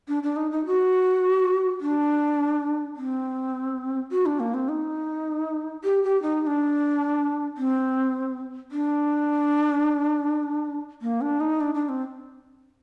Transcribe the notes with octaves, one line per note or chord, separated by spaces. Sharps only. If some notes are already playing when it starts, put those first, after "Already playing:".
D4
D4
D#4
D#4
F#4
D4
C4
F#4
D4
A#3
C4
D#4
G4
G4
D#4
D#4
D4
C4
D4
A#3
D4
D#4
D4
D4
C4